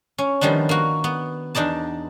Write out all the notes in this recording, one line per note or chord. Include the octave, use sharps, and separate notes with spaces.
C#4
D#3 F3 G3 B3 D4
A#3 F#4
B3
E2 D4 D#4 D5 A5